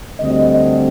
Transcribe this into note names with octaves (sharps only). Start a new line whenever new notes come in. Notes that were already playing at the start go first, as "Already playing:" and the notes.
D2 D3 G3 C4 D#5
D#5